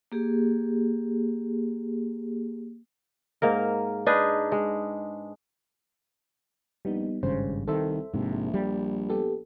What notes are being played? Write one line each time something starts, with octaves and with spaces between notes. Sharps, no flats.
A#3 G4 G#4
G#2 A#3 A#4
D4 D#4 G#4 B4
G#3
A#1 G3 B3 D#4
G#1 C#2 G2 C#3 C5
C2 D#3 A4 C5 E5
A#1 G#2 C3
G3
B3 G4 A4